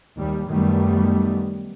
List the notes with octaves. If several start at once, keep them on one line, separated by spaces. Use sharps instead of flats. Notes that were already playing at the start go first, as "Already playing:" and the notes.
D#2 G3
F#2 D#3 G3 A3 B3